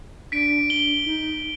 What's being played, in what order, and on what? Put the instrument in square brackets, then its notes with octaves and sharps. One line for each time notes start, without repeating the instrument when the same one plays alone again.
[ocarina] D4 [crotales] B6 D7
[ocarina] D4 [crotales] G7
[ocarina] D#4